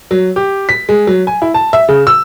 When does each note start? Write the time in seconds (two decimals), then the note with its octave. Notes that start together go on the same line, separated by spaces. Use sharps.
0.11 F#3
0.36 G4
0.69 B6
0.89 G#3
1.07 F#3
1.27 G#5
1.42 E4
1.54 A5
1.73 E5
1.89 C#3
2.07 E6